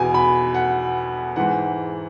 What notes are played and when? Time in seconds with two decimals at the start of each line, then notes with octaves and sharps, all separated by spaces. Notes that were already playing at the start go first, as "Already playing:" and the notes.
Already playing: E2 B2 G#5
0.14 B5
0.54 F#5
1.36 G#2 E3 F#5